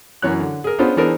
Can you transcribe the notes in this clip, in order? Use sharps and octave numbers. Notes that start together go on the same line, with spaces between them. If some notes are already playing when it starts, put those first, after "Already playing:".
F#2 E3 C#5 F#6
D3
G#4 A#4
B3 C#4 D4 F4 G#4 C5
E3 B3 D4 G#4 A#4 C5